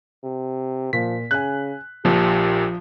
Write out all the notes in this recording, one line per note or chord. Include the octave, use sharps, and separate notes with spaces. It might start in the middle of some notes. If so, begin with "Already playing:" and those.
C3
A#2 F3 B6
C#3 G#5 F#6
A#1 A#2 F3 G4